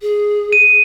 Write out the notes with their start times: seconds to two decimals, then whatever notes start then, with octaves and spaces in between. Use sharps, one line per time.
0.02 G#4
0.53 D#7